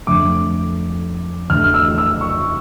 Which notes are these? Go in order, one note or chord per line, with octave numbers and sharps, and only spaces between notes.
F2 D3 A3 D6
E2 D3 A3 F6
F6
E6
E6
C#6